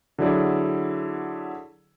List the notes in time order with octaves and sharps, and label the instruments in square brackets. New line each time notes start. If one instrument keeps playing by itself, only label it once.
[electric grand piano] D3 F#3 E4 G#4 D5